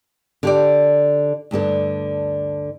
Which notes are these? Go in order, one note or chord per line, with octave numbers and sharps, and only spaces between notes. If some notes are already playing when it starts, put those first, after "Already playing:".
D3 G4 D5
D2 G2 D3 A4